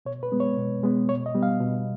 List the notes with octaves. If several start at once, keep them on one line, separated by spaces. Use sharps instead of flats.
B2 C#5
B4
G#3 B3
C#5
B2
G#3 B3
B2 C#5
D#5
G3 B3
F5
B2